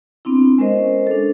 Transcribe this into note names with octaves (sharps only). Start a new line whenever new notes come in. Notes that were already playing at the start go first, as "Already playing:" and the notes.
B3 C4 D4 E4
G#3 C#4 A#4 C5 D#5
D4 A4